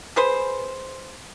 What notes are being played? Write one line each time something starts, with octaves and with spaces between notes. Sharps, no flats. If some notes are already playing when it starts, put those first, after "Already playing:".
G#4 B4 C5